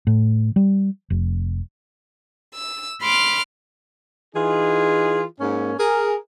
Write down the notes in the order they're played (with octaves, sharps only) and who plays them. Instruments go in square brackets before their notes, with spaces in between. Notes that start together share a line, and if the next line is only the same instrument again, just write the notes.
[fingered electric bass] A2
G3
F1
[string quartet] E6
B5 C6 D6 F6
[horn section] E3 D#4 F4 G#4
G#2 A#3 C#4
G#4 A#4